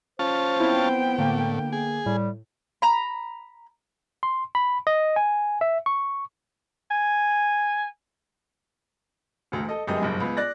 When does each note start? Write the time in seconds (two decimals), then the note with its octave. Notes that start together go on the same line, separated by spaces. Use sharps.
0.19 C#4 F4 C5 A5
0.60 B3 C4 E4 G5
1.18 A2 D3 A#3
1.72 G#4
2.06 A2 G3
2.82 A#5 B5
4.23 C6
4.55 B5
4.87 D#5
5.16 G#5
5.61 E5
5.86 C#6
6.91 G#5
9.52 E1 D2
9.69 A4 D#5
9.87 G1 F#2 G#3 G4 D#5
10.01 F#1 B1 G2
10.20 C#2 B3
10.37 D5 F#6 A#6